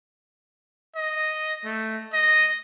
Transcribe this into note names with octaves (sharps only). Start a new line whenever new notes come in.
D#5
A3
D#5